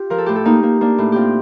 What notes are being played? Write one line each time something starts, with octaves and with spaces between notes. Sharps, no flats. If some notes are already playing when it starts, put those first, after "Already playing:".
Already playing: F4 G4
F3 A#4
A4
A2 G4
A4
A#3 D#4
A#3
A#3 D4
A2
C4 F4 G4